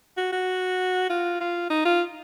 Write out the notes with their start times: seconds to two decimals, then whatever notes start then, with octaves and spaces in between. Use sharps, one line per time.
0.17 F#4
0.32 F#4
1.09 F4
1.40 F4
1.70 D#4
1.85 F4